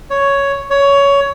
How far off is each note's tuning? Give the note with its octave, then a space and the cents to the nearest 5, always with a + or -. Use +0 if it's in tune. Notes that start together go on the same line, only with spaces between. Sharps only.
C#5 +5
C#5 +15